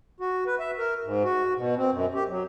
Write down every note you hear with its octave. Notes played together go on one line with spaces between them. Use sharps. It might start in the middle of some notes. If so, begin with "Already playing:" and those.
F#4
B4
E5
A#4
G#2
F#4
B2
C4
F#2
G4
F#3